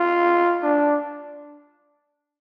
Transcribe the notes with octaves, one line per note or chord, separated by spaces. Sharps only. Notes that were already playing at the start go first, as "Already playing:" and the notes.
Already playing: F4
D4